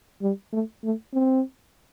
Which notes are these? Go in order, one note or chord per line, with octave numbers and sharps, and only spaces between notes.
G3
A3
A3
C4